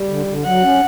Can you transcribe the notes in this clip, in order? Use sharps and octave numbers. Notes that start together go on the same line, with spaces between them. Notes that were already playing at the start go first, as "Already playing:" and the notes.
Already playing: G3
D3
D3
F#3 F#5
C#4